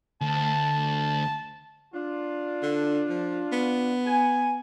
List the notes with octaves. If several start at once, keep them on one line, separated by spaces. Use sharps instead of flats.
D2 A5
D4 F4
D3
F3
B3
G#5